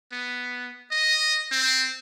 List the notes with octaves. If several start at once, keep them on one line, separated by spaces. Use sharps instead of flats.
B3
D#5
C4